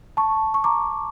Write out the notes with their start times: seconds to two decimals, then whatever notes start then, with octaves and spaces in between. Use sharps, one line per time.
0.17 A5 C#6
0.54 C#6
0.64 A#5 D6